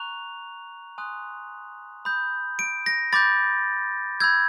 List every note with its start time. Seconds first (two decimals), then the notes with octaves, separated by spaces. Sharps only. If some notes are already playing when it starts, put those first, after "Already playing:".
Already playing: A#5 C#6 F#6 F7
0.98 G#5 C6 D#6 F#6
2.05 B5 D#6 G6
2.59 D7
2.86 A#6
3.13 B5 D6 G6 A6
4.20 B5 E6 G6 G#6